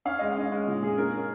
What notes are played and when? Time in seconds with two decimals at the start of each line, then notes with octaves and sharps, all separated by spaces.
0.05 C#4 F5
0.19 G#3 D#5
0.32 F5
0.37 C#4
0.52 G#3
0.67 A#2
0.82 A#2 G#4
0.98 C#4 A#4
1.13 C#4 A#4